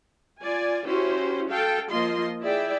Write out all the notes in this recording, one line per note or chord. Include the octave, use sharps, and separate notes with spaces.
F4 D5 G#5
C#4 E4 F#4 G4 C5
F#4 A4 F5 G5
F3 A#3 F4 D#5 C6
E4 G#4 D5 E5 G5